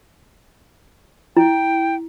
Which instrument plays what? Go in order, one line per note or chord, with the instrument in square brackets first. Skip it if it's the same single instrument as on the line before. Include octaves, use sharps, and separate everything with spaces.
[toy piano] E4 [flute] G5